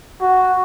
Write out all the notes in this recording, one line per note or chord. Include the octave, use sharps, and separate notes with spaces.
F#4